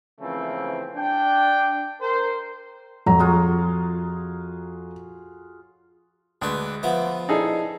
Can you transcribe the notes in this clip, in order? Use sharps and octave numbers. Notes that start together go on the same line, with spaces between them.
C#3 E3 F3 A3 A#3 C4
D4 G5
A#4 C5
F2 F#3 A#5
F4 F#4 G#4
D2 G#3 D4 B4
F3 B3 E5 F#5 D6
D#4 E4 G#4 A4 D5 D#5